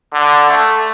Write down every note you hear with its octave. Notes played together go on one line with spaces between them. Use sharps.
D3
A3